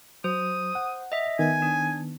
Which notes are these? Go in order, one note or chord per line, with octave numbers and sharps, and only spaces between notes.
F#3 C5 D#6
F#5
D#5 E5
D#3 B3 G#5
D4